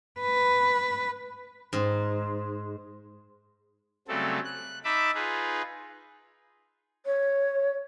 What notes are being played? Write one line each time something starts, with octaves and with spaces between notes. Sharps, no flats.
B4
G#2
C#3 F#3 G3 A3 C4 A4
F#6
D#4 E5 A5 B5 D6
D#4 F4 G#4 B4
C#5